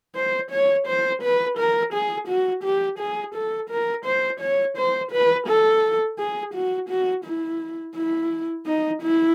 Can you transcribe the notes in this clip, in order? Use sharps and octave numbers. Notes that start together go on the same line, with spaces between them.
C5
C#5
C5
B4
A#4
G#4
F#4
G4
G#4
A4
A#4
C5
C#5
C5
B4
A4
G#4
F#4
F#4
E4
E4
D#4
E4